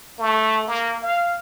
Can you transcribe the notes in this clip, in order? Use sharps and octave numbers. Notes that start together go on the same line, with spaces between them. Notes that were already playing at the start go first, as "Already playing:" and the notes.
A3
A#3
F5